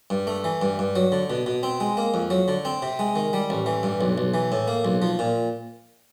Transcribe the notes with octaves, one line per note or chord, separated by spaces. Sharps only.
G2
A3
E3
G2
G2
F#3
D3
B2
B2
C4
G#3
A#3
F2
F#3
D3
C4
C3
G#3
D#3
G3
A1
E3
G2
B1
B1
E3
A2
A#3
B1
F3
A#2